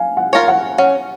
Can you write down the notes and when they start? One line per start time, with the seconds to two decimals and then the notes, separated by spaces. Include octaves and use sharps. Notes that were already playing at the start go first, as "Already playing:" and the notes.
Already playing: F5 G#5
0.17 F#5
0.33 F4 A#4 C#5
0.48 F#5
0.78 C#4 F#5